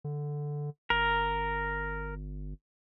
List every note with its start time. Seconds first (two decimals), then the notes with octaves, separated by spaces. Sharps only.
0.04 D3
0.90 G1 A#4